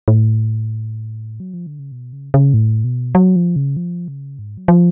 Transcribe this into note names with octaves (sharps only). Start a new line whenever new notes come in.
A2
F#3
F3
D3
C#3
B2
C#3
C#3
A2
B2
F#3
F3
C#3
F3
C#3
G#2
F#3
F3